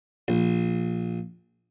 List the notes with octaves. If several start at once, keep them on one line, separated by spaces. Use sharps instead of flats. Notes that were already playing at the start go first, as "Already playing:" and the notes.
A#1